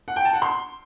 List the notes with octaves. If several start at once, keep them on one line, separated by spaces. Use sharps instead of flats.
F#5
G5
A5
F#5
C6